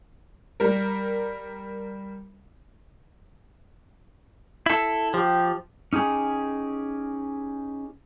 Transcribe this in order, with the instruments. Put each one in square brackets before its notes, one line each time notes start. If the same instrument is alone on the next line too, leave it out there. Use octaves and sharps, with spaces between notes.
[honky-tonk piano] G3 A#4
[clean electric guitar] E4 A4
[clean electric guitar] F3 [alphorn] G4
[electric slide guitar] C#4 D#4 G4 G#4